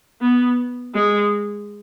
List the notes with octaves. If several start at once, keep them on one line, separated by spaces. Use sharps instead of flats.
B3
G#3